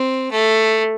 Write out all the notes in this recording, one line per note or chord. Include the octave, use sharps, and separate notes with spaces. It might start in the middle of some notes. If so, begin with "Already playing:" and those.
Already playing: C4
A3